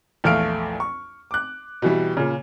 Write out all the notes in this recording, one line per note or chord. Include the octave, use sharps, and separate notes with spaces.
A#1 E2 A3 F5 F6 D7
C#6
D6 F#6
B2 E3 G3
A#2 C#3